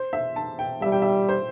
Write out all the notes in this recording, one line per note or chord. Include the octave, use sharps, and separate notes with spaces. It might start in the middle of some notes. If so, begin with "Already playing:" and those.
Already playing: C5
E5
A5
G5
G3 E5
G5
E5
C5